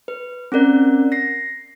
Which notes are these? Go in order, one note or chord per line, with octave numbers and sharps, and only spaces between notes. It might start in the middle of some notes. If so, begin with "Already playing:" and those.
B4
C4 C#4 A#4 D5
A#6 C7